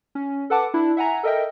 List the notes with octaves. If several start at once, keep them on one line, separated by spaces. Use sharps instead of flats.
C#4
A4 B4 F#5 A5 D6
D4 E4
E5 F#5 G#5 A#5
A4 A#4 D#5 E5 G5